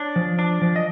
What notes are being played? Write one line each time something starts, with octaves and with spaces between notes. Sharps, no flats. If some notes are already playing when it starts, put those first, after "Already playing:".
Already playing: D4 C#5
F3
D4
F3
D#5